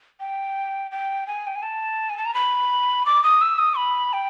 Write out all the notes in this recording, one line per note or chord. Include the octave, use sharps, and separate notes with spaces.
G5
G5
G#5
G5
G#5
A5
G#5
A5
A#5
B5
D6
D#6
E6
D#6
B5
G5